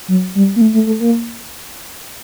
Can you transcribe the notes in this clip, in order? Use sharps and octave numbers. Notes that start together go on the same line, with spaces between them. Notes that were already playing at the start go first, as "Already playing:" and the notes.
F#3
G3
A#3
A3
A3
A3
A#3